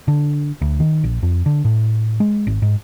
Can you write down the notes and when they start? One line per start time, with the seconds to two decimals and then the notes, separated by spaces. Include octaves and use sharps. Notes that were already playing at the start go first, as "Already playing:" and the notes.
0.08 D3
0.62 D2
0.80 D#3
1.04 A#1
1.23 F2
1.46 D3
1.65 A2
2.20 G#3
2.47 G#1
2.62 G#2